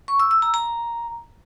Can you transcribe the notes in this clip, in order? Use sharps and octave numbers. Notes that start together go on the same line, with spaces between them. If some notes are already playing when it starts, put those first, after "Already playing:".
C#6
E6
E6
A#5
A#5